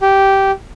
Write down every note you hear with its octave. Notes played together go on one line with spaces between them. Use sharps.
G4